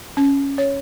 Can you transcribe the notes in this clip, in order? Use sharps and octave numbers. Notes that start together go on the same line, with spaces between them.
C#4
C#5